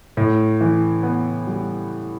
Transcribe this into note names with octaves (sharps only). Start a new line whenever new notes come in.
A2
E3
B3
G3